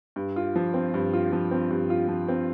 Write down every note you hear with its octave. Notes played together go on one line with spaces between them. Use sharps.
G2
F4
F3
C4
G2
F4
F3
C4
G2
F4
F3
C4